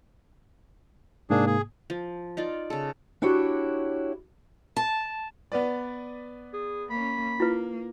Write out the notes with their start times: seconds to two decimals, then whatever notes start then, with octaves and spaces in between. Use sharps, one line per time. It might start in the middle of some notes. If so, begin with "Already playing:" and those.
1.30 G#2 C3 A#3 D4 G#4
1.46 G#4
1.90 F3
2.37 D#4 F4 D5
2.70 C#3 A4
3.22 D4 E4 F#4 G4 C#5
4.76 A5
5.52 B3 B4 D5
6.53 G#4
6.90 A#3 C#4 B5
7.40 A#3 E4 F4 B4